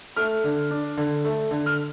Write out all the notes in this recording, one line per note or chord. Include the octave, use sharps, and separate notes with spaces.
A3 F6
D3
D4
D3
A3
D3
F6